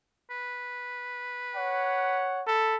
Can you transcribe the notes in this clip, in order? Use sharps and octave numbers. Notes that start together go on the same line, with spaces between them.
B4
C#5 F#5
A4 B5